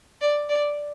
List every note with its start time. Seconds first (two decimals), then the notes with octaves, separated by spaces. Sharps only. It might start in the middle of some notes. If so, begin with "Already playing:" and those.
0.21 D5
0.49 D5